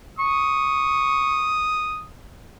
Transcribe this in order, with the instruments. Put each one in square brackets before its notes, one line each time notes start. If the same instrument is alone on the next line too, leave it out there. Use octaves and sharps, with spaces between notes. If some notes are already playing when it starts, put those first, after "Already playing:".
[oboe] C#6 [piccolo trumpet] D#6